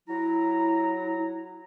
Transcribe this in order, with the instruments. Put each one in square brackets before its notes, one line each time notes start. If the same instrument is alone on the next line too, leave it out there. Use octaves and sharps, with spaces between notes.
[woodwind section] F#3 A#5 [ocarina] E4